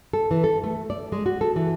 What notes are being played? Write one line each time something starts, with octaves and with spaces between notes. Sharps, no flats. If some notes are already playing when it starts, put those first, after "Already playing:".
A4
E3
A4
A3
D5
G#3
F#4
A4
E3